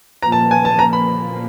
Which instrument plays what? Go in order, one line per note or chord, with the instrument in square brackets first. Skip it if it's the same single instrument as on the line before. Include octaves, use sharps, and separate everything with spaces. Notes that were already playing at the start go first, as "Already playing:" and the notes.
[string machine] A#2 F3 A#3 [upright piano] A#5
[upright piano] A5
G#5
A5
A#5
B5